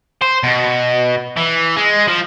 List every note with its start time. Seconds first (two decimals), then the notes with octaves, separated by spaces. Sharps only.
0.22 C5
0.43 B2
1.37 E3
1.77 G#3
2.08 F3